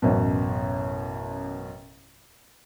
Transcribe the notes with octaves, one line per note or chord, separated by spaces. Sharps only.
A1 F#2 B2